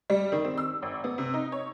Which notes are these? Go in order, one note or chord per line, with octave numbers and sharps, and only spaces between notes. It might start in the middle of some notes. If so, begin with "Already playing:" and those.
G3
D#3
C4
E6
G#1
B3
C3
D#4
C#5